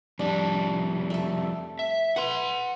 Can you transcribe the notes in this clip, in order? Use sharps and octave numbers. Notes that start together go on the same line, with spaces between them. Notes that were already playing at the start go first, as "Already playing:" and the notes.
F2 G3 D4
A3 A4
E5
B4 F#5 C6